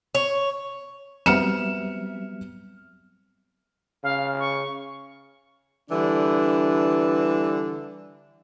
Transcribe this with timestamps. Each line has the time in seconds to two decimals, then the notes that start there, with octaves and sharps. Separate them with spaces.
0.15 C#5
1.26 F#3 G3 B3 C4 E5 F6 C#7 E7
4.03 C#3 F5
4.40 C#6
5.90 D3 E3 G3 D4